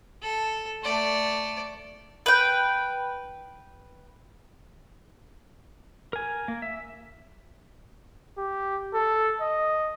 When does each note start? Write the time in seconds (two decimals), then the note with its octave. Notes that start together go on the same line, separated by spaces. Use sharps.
0.22 A4
0.83 A3 D5
2.26 B4 G5
6.13 A#4 G#5
6.48 A#3
6.62 E5
8.38 G4
8.94 A4
9.41 D#5